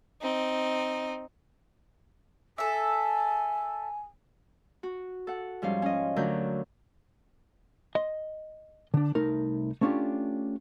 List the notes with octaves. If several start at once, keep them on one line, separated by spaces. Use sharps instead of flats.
C4 D#4
A4 E5 G#5
F#4
A4 F#5
G#2 F3 G3 C#4 F5
C#4 D#5
D2 D3 F#3 D4 A#4 G6
D#5 C6
D3 D4
C2 A3 D#4 A#4
A3 B3 C#4 D4 F4 G4